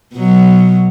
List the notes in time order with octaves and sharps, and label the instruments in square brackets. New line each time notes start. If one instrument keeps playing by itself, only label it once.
[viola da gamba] B2 F#3